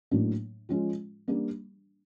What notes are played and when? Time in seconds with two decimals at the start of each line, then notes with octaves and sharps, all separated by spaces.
0.11 A2 F#3 A#3 D4
0.69 F3 G#3 C#4 F4
1.28 G3 A#3 D4